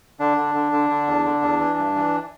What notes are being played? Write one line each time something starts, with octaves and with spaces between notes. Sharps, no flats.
D3 D4
D3
D3
D3
D3
E2
D3
E2
E3
G2
E3